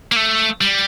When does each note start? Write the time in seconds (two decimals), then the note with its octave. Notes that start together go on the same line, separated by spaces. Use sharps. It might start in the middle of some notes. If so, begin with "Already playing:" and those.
0.12 A#3
0.16 A3
0.61 G3